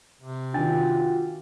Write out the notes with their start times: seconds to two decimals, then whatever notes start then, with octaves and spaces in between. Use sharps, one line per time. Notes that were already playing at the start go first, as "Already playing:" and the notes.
0.21 C3
0.54 D#3 D4 F4 F#4 G5 G#5 A6